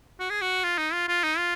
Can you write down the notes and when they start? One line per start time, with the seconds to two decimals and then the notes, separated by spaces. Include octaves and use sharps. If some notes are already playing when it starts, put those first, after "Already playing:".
0.20 F#4
0.30 G#4
0.42 F#4
0.64 F4
0.78 D#4
0.93 F4
1.08 F4
1.24 D#4
1.38 F4